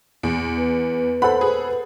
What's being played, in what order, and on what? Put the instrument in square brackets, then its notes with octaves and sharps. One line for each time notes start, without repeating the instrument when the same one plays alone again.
[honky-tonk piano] E2
[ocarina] B4
[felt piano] A4 C5 F#5 [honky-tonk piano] B5
[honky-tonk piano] G#4